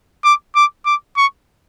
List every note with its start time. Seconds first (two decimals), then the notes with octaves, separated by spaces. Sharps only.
0.25 D6
0.56 D6
0.86 D6
1.17 C#6